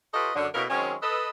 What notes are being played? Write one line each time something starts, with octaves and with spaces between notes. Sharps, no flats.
F4 G4 A4 B4 C#5 D#5
F#2 D3
B2 A#3 C#4 E4 A4 A#4
D#3 F#3 G#3 C4 C#4
A4 B4 D#5